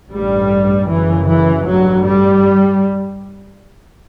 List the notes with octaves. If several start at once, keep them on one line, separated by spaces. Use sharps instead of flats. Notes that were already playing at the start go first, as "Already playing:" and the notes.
A1 G2 G3
G1 F#2 C#3 E3
E3
A1 G2 F#3
G3